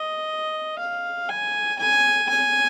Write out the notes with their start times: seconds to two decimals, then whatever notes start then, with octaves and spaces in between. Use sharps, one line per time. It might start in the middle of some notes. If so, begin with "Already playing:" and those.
Already playing: D#5
0.79 F5
1.29 G#5
1.79 G#5
2.29 G#5